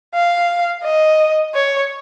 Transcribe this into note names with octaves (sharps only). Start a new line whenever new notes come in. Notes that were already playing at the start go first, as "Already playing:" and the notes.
F5
D#5
C#5